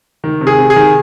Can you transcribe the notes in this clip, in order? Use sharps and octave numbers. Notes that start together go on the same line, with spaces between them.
D#3
C3
G#4
C3
G#4
D#3